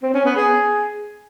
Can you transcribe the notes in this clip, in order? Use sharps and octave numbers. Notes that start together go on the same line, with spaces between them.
C4
C#4
B3
G#4